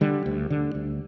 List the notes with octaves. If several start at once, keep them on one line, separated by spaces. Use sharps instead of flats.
D3 G3
D2
D3
D2